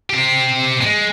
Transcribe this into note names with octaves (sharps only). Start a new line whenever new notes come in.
C4 G4
G#3